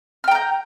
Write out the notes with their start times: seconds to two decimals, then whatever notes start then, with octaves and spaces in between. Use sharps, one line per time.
0.24 F6
0.28 G5
0.31 A#5
0.35 G6